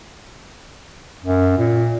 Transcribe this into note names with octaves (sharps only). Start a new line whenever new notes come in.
F#2
A#2